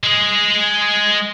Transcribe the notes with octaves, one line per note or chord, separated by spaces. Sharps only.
G#3 G#4